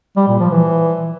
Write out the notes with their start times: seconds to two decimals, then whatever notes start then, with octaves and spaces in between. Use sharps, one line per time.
0.17 G3
0.28 A#2
0.39 F3
0.50 E3